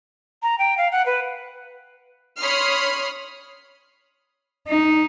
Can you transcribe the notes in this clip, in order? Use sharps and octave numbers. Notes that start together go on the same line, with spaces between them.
A#5
G5
F5
F#5
B4
C#5 B5 C6 D#6 F6 C7
D#4